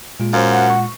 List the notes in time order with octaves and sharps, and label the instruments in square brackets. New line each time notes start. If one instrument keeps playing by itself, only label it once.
[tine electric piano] A#2 G#3 F4
[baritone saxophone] F#2 [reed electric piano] C5 F5
[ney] F#5
[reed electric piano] C#6